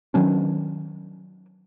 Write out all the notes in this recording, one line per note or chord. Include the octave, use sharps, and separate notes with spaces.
D#3 F#3 C#4 D4